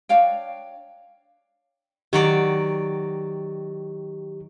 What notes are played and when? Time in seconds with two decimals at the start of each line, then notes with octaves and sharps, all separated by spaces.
0.09 D4 C#5 F5 G5
2.13 D#3 F#3 G4 D5